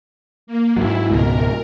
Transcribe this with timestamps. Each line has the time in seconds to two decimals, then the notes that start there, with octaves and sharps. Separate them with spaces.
0.47 A#3
0.77 G#2 F#3 E4
1.10 C#2 G#2 B2 A#4